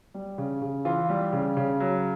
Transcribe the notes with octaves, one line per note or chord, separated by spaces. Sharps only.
G3
C#3
C#3
E3 F4
G3
C#3
C#3
F#3